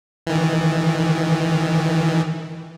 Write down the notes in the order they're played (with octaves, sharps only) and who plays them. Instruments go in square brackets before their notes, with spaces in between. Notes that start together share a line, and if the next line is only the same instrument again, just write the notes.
[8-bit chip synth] D#3 E3